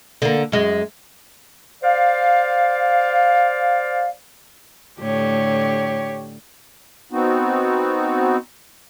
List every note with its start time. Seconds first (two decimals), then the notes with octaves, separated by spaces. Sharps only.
0.22 D3 A#3
0.52 F#2 G#3
1.82 C5 D5 F5
5.00 A2 D3 G4 C#5
7.12 B3 C4 D#4 F#4